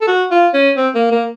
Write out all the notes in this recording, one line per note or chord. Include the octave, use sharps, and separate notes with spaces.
A4
F#4
F4
C#4
C4
A#3
A#3